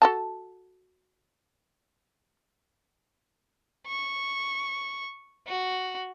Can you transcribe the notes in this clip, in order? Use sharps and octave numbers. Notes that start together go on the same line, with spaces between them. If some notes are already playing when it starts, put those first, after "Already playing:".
F#4 A4 A5
C#6
F#4